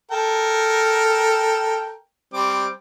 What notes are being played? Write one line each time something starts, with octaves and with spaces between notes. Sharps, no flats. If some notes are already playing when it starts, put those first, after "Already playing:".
A4 A#4 G5
G3 C4 D6